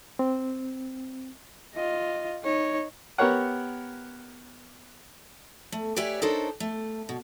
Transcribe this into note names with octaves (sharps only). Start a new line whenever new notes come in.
C4
F4 D#5
D#4 C#5
B3 G4 A#4 C#5 F#5
A3
G4 B4 C#5 D5 E5 G#5
D4 D#4 A4 A#4 C5 C#5
A3
B2